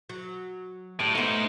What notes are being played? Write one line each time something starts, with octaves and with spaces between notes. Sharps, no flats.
F#3
A2 G3
A3 B3 D#4 C5